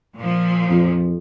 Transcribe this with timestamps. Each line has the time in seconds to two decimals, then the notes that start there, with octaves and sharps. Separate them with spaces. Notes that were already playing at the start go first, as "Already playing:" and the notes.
0.15 A#2 F3
0.70 F2